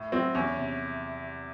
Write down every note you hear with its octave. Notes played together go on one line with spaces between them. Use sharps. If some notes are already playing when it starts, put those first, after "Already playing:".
Already playing: A2
F#3 C4
E2 C#4
C3